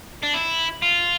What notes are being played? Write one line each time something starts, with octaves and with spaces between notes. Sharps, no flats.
D4
E4
F4